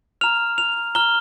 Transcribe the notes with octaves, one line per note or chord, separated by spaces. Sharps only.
A#5 F6 F7
F7
A#5 F6 G7